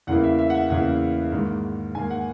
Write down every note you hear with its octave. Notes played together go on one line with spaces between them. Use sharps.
E2 C#3 E3 A#3 E4 F#5
E5
E5
F#5
E5
E2 C#3 E3 A#3 E4 F#5
G#2 D#3 A#3
G#2 D#3 A#3 G#5
F#5